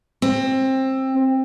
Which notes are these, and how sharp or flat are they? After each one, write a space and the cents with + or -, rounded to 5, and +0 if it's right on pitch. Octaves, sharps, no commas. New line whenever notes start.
C4 +20